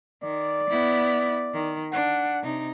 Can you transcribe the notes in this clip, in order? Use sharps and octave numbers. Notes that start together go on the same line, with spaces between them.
D#3 D5
B3 E4
D#3
D4 F#5
C3 D#4